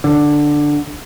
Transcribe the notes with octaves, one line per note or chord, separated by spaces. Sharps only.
D3